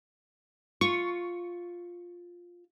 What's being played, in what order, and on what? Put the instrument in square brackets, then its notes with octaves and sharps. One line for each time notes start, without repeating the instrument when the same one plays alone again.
[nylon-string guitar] F4 [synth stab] C#6